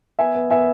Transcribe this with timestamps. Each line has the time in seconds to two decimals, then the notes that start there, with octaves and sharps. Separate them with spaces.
0.19 B3 E5 G#5
0.35 B3
0.50 B3 E5 G#5